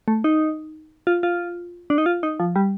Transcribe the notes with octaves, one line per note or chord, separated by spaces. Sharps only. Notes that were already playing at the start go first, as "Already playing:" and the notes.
A3
D#4
F4
F4
D4
D#4
F4
D#4
F3
G3